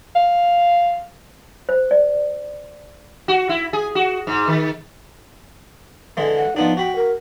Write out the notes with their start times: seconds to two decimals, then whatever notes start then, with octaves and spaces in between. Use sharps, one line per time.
0.15 F5
1.69 C5
1.91 D5
3.28 F#4
3.49 E4
3.73 G#4
3.95 F#4
4.27 G#2
4.48 D#3
6.17 D3 E3 G#3
6.37 F#5
6.56 F3 B3 D4 D#4
6.77 F#4 G5 B5
6.96 A#4